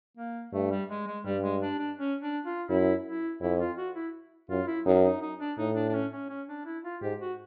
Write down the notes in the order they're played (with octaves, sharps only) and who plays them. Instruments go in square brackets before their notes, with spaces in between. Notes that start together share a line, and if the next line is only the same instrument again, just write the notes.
[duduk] A#3
[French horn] G2 [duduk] A3
[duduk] G3
G#3
G#3
[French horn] G2 [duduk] G3
[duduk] G#3
D4
D4
C#4
D4
F4
[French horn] F#2 [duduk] E4
[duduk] E4
[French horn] F2 [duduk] E4
[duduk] F4
F#4
E4
[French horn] F#2 [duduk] F4
[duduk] E4
[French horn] F#2 [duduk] D#4
[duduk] D#4
D#4
D4
[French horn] A2 [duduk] D#4
[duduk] D4
D4
C#4
C#4
C#4
D4
E4
F4
[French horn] G#2 [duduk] G4
[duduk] F#4